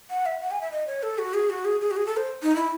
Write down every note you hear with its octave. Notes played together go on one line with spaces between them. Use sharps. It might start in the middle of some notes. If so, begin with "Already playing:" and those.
F#5
E5
F#5
G#5
E5
D#5
C#5
A4
F#4
G#4
F#4
G#4
G#4
F#4
G#4
A4
C5
D#4
E4